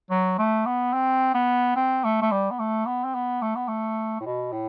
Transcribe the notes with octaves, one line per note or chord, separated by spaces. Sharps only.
F#3
A3
B3
C4
B3
C4
A3
A3
G3
B3
A3
B3
C4
B3
A3
B3
A3
A2
B2
A2